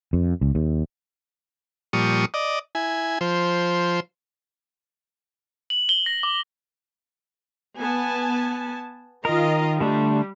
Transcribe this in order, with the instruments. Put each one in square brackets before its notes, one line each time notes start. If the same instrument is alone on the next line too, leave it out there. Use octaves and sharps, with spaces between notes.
[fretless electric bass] F2
C#2
D#2
[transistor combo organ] A#2 F3 G3 C#6 D#6
D5 D#5
E4 G#5
F3 C5
[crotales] F#7
G7
A#6
D6
[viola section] B3 G#5 A5
[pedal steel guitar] D#3 A#4 [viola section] F4 D#5
[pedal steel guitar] D3 A3 D4 [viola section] G3